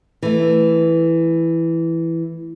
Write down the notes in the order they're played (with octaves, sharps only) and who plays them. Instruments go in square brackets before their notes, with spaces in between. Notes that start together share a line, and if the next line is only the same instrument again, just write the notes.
[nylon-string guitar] E3 A3